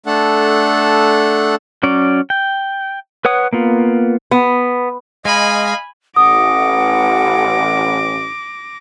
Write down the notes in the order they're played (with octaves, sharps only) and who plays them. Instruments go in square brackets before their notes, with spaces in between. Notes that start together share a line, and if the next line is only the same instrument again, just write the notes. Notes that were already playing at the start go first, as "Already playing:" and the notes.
[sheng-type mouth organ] A3 D4 A4 F#5
[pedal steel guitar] F#3 C#4 D5
G5
B4 C#5 F#5 D#6
A#3 B3 F4
[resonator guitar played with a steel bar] B3
[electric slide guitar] G#3 [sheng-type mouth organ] D#5 F5 [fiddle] G#5 B5
[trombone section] A1 [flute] F#5 [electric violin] D6 A#6 [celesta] D#6